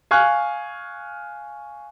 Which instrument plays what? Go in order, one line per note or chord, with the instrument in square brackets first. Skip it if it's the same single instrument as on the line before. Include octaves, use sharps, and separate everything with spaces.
[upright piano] F5 G#5 C#6 F6 F#6